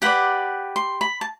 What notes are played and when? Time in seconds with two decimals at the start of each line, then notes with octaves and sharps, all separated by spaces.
0.02 G4 B4 D5 F#5
0.76 C6
1.01 B5
1.21 A5